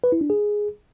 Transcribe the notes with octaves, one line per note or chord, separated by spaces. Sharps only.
B4
E4
D4
G#4